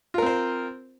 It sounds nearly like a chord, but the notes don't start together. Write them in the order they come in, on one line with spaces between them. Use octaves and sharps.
F4 A#4 C4 C5